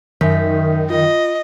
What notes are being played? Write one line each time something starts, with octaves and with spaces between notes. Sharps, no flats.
F#2 D#3 E5 G6 B6
F4 D#5